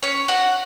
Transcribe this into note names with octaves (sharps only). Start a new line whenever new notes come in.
C#4 C#5
F#4 F#5